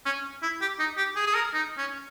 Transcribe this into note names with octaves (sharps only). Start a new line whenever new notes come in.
C#4
E4
G4
D#4
G4
G#4
G#4
A#4
D#4
C#4